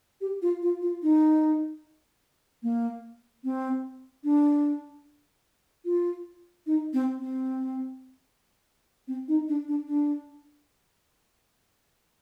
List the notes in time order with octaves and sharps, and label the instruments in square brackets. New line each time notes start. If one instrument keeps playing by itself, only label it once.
[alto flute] G4
F4
F4
F4
D#4
A#3
C4
D4
F4
D#4
C4
C4
C4
D#4
D4
D4
D4